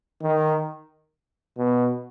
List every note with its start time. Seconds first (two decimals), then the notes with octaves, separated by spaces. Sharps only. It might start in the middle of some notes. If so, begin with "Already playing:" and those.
0.22 D#3
1.58 B2